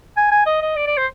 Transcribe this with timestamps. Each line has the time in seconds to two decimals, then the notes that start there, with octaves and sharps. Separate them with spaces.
0.17 G#5
0.31 G#5
0.46 D#5
0.62 D#5
0.76 D5
0.87 D5
0.97 C5